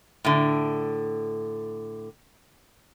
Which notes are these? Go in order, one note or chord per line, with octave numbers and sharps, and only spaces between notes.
A2 D3